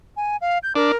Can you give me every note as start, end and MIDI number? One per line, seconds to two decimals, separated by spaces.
0.17 0.36 80
0.41 0.58 77
0.63 0.73 91
0.75 0.92 62
0.75 0.97 70